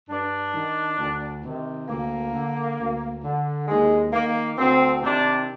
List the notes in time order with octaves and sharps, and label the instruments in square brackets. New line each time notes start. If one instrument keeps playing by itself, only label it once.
[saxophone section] G2 D4
D#3
D2
C3 D#3
D2 A#3
D3
D2
D3
D#2 G#3
D#3 A#3
D2 C4
C3 D#3 D4